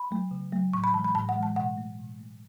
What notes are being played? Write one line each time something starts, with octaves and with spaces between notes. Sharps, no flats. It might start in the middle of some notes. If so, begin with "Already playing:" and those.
Already playing: B5
F#3 A3
C#3
F#3 A3
A2 C#6
B5
E3 G#3 A5
B5
A2 A5
F#5
E3 G#3
A5
B2 F#5
A3
B2
A3